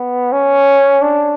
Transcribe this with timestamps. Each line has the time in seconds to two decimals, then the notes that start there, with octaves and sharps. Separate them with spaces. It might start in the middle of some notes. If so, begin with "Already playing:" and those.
Already playing: B3
0.32 C#4
1.02 D4